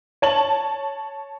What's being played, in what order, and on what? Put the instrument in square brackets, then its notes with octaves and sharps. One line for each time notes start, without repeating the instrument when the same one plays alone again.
[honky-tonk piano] C#5 A5 F#7